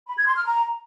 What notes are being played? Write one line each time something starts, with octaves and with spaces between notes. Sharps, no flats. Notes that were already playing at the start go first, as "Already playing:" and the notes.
B5
G#6
C6
F6
A#5